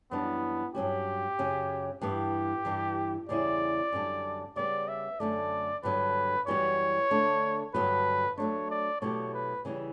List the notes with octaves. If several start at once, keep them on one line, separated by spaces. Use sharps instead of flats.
F#2 E3 G3 B3 D4
G2 F#3 C#4 F#4 G4
F#2 C#3 F#3
G2 E3 B3 G4
G2 E3 G3
E2 C#3 G3 C#4 E4 D5
F#2 D3 G3 D4
C#3 G3 B3 D5
E5
F#2 D3 A3 D5
G2 D3 F#3 B3 B4
F#2 E3 G3 B3 F#4 C#5
D3 A3 D4
G2 D3 F#3 B3 F#4 B4
F#3 A3 D4 C#5
D5
B2 F#3 A3 E4 G4 C#5
B4
C#3 E3 G3 C#4 E4